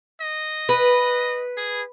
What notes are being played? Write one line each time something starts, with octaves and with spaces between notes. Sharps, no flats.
D#5
B4
G#4